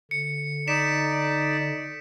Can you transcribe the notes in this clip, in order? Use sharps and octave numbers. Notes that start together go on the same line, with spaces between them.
D3 C#7
D#4 D5 B6 D7 E7